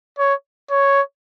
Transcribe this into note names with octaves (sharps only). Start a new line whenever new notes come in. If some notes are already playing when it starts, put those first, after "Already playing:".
C#5
C#5